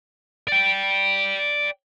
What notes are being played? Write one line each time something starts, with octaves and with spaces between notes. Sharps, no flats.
D5 G5